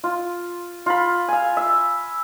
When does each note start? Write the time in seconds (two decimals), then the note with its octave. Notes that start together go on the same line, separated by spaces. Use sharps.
0.04 F4
0.86 F4 B5
1.28 F5 G#5
1.57 E5